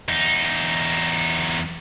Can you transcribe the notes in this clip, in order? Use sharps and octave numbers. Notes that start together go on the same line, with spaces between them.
E2 D#4